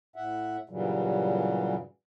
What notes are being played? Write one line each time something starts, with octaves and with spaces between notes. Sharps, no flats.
A2 E5 F#5
G2 A#2 C#3 E3 F#3 G3